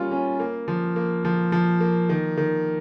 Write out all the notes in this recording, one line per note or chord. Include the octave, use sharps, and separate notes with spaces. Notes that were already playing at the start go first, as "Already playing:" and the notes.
Already playing: G3 A#3 C#4 F4
C#4
A#3
F3
A#3
F3
F3
A#3
D#3
D#3